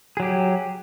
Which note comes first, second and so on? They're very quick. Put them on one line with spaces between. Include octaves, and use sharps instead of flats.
G#4 F#3 G4